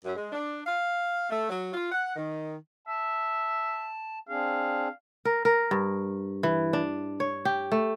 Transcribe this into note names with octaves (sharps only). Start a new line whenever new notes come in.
F#2
G#3
D4
F5
A3
F#3
F4
F#5
D#3
E5 A5
C4 D4 G#4 F5
A#4
A#4
G2
E3
D4
C#5
G4
A3